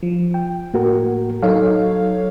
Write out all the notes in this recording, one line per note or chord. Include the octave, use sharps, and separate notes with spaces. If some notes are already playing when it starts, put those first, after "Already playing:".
F3
G5
A2 A#3 F#4 A#4
F#3 D#4 A4 C#5 F5